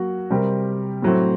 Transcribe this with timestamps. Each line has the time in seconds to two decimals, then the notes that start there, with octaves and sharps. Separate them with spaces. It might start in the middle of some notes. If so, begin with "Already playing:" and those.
Already playing: F#3 A#3 F#4
0.30 C3 G3 C4 G4 A#4
1.02 A2 F#3 A3 C4